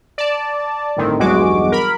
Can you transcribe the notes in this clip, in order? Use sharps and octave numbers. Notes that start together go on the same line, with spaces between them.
D5 A5
G1 A2 D#3 C4
B1 E2 G2 G#3 F#4 D6
A#4 B5